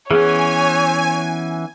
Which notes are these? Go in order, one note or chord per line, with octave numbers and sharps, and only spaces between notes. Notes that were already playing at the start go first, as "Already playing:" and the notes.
E3 B3 C#4 G#4 C#5 G#5